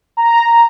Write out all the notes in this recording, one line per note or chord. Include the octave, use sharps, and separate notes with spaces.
A#5